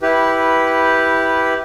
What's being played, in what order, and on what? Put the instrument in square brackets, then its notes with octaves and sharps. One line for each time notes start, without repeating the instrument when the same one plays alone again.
[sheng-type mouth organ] E4 G4 B4